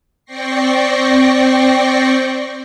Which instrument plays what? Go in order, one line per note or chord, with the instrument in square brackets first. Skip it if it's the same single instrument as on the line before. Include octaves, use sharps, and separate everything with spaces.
[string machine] C4 D5 G5 C#6 A#6 C7